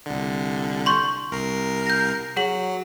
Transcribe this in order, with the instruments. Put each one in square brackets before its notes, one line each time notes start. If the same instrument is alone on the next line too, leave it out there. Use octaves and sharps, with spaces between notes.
[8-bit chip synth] C2 D3
[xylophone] C6 C#6 G6
[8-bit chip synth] C2 A#4 C7
[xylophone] G6 A#6
[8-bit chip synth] F#3 [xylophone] G#4 F#5 F#7